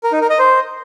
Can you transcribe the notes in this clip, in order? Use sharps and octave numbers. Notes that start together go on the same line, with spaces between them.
A#4
D#4
A#4
D#5
C5